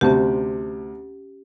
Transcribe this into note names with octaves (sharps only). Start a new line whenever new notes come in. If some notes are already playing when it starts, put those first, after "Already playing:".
D2 C3 C#4 G4 A5